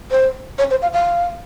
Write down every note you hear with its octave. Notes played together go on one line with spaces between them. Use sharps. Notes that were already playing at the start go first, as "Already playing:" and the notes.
C5
C#5
C5
F5
F5